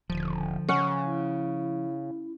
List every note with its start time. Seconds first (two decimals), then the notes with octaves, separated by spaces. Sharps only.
0.10 D#1 D3 F3
0.69 C#3 C#4 F#5
1.03 E4